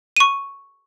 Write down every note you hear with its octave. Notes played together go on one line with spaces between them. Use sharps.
C#6 D#7